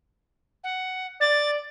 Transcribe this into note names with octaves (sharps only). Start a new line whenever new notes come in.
F#5
D5 A6